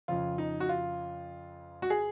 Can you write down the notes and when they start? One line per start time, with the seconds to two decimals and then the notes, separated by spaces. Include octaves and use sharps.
0.08 F2 C#3 F3 F4
0.38 D#4
0.60 F#4
0.69 F4
1.82 F#4
1.90 G#4